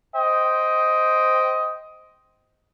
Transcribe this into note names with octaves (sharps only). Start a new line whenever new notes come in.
C5 D#5 G5